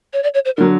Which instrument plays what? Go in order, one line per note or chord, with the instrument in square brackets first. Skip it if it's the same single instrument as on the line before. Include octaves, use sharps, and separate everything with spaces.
[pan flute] C#5
D5
C#5
C5
[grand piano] D3 F#3 [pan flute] A#4